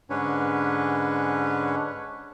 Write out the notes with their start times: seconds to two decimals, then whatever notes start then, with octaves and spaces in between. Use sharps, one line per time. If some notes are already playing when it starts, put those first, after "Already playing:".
0.10 G#2 D3 C#4 D4 B4 C#5